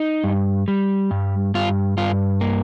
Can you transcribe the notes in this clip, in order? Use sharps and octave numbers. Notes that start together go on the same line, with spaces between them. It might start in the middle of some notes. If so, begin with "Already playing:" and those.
Already playing: D#4
G2
G3
G2
G2 F4
G2 F4
A#3